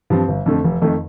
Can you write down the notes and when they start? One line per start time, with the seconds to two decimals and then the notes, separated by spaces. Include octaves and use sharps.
0.10 G2 F3 C4
0.28 G1
0.46 F2 D3 A3 C4
0.64 F1
0.82 F2 D#3 A3